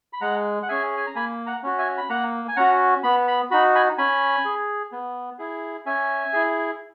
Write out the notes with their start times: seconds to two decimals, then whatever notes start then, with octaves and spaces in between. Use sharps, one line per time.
0.13 B5
0.21 G#3 F#5 A#5
0.63 F#5
0.69 C#4 G#4 E5 G#5
0.97 G#5
1.07 A#5
1.15 A#3 G#5 B5
1.46 F#5 A#5
1.63 C#4 F#4
1.78 E5 G#5
1.98 B5
2.09 A#3 F#5 A#5
2.48 G#5
2.56 C#4 F#4 F#5 A#5
3.04 B3 B5
3.28 B5
3.51 D#4 F#4 B5
3.75 G#5 B5
3.98 C#4 G#5 B5
4.45 G#4
4.92 B3
5.39 E4 G#4
5.86 C#4 E5 G#5
6.33 E4 G#4